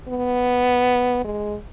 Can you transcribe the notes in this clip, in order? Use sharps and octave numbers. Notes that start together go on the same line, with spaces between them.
B3
G#3